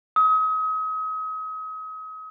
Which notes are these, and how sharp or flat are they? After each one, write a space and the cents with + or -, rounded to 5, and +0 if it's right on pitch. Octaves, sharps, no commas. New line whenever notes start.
D#6 +35